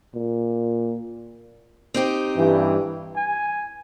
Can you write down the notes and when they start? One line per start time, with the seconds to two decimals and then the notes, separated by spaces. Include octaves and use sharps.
0.15 A#2
1.94 C4 D#4 G4
2.36 G2 E3
3.16 G#5